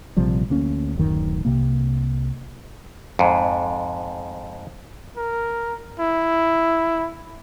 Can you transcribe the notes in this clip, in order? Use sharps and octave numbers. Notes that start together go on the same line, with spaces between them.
A#1 C3 F3 G3
D2 A#3 C#4
D1 F#2 D#3
C2 C3 A#3
F2 G#2
A#4
E4